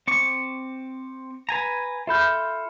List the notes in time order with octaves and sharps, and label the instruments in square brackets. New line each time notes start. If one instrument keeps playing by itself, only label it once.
[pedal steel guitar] C4 C#6 D6 [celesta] C#7
[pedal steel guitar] B4 G#5 A#5
[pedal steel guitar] F4 A4 G6 [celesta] E5 B5 F6